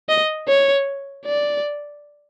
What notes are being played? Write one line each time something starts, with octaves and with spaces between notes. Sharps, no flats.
D#5
C#5
D5